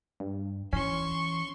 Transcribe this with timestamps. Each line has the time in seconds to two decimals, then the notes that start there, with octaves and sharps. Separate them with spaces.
0.20 G2
0.73 E3 C#4 C6 C#6